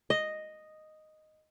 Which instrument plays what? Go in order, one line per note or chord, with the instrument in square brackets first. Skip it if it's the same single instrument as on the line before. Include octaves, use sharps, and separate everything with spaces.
[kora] D#5